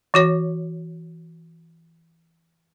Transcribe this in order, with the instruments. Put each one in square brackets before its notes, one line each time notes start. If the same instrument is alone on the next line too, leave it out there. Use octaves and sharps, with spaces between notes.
[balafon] E3 F#4 C#5